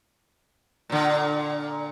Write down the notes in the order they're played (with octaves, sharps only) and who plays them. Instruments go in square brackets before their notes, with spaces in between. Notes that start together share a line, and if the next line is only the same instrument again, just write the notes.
[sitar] A#2 D3